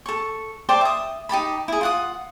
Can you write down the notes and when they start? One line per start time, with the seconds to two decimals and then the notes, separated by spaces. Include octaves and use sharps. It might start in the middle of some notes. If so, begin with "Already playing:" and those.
0.06 A4 C#6
0.69 C5 D5 G5 A5
0.81 E5 D#6
1.29 D#4 G4 A5 B5
1.68 E4 G#4
1.81 F4 F#5 D#6